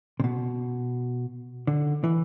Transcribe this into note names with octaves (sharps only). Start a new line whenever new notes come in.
C3
B2
D3
E3